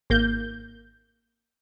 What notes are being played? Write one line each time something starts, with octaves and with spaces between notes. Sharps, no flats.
G#1 A#3 G6